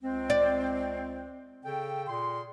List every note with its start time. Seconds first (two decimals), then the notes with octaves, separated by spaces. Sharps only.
0.01 C#2 G#3 C4
0.30 D5
1.65 C#3 A4 G5
2.08 A#2 G#4 C6